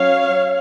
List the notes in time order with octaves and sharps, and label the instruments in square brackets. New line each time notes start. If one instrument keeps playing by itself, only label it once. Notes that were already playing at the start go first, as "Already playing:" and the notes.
Already playing: [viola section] F#3 C#4 C#5 F5